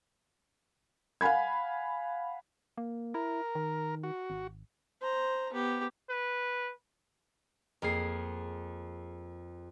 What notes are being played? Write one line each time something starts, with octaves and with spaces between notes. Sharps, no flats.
F5 F#5 G#5 B5 G#6
A#3
E4 A#4
D#3
F#4
G#1
C5 A#5
B3 G4
B4
F2 A#3 G#4 C7